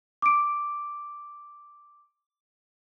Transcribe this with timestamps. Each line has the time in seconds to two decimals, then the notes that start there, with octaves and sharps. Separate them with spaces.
0.22 D6 D7